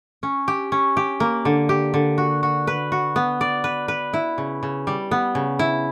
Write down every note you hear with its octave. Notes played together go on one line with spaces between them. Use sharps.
C#4
G4
C#4
G4
A#3
D3
G4
D3
F#4
F#4
B4
F#4
B3
D5
B4
B4
E4
C#3
C#3
G3
B3
C#3
E4